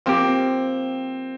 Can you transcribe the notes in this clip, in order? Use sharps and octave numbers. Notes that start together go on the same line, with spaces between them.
F3 A#3 C4 G4